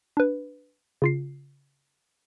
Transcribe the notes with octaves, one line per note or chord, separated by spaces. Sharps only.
D4 B4
C#3 F4 C7